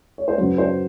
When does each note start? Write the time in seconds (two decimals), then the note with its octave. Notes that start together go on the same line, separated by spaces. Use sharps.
0.18 C#5
0.28 C5
0.38 F#2 C#3 F#3 B4
0.58 C5